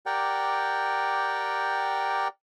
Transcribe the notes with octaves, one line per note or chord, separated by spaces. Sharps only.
G4 A#4 D5 F#5 G5